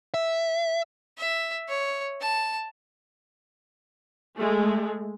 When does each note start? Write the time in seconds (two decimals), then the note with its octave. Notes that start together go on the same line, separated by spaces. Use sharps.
0.14 E5
1.18 E5
1.68 C#5
2.21 A5
4.36 G#3 A3